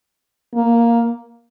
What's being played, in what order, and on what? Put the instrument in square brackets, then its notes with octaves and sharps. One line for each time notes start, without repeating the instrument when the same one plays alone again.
[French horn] A#3